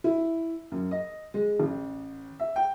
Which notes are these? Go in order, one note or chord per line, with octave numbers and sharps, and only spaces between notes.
E4
F#2
D#5
G#3
A1
E5
G5